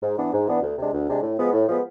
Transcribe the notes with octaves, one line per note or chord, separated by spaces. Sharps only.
G#2
E3 B3 D4
G#2
E3 B3 D4
D2
C3 G#3 D4
D2
C3 G#3 D4
A2
F3 G#3 B3
A2
F3 G#3 B3